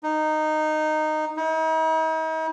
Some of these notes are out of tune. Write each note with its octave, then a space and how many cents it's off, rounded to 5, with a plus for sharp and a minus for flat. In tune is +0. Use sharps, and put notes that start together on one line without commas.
D#4 -10
D#4 +45